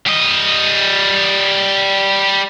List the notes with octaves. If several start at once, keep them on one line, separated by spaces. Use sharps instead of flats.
G3 D#5